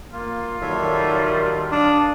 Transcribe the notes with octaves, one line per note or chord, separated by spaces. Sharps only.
A#3 F4
D#3 F#3 G3 A4 C#5 E5
D4 F5 D#6